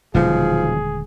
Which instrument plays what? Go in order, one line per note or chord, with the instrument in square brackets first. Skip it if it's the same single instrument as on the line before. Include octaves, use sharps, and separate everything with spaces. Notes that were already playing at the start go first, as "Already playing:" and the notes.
[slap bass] D#1 D3 G#3 [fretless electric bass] B2 D#3 F#3 [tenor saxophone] F3 [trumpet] G#4